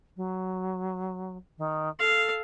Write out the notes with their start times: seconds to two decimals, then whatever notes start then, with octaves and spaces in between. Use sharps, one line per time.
0.16 F#3
1.58 D#3
2.00 A4 F5